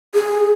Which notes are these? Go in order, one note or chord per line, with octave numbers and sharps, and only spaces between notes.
G#4